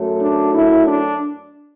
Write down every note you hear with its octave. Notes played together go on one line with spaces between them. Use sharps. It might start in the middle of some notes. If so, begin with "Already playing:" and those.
Already playing: F#2 F#3 A3
D4
E4
D4